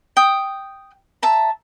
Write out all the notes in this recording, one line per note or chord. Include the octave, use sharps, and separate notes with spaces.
G5 D#6
E5 A5 A#5